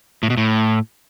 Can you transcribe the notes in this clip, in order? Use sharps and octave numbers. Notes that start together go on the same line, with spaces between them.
A2
B2
A2